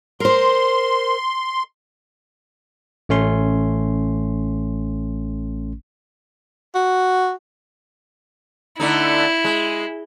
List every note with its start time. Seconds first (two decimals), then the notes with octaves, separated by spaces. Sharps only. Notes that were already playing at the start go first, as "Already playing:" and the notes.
0.20 A#4 C5 C6
3.09 A1 A3 C#4 C6
6.75 F#4
8.80 D3 A3 D#4 E4
9.44 G#3